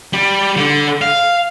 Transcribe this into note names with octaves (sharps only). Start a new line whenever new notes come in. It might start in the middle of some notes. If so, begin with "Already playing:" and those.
G3
D3
F5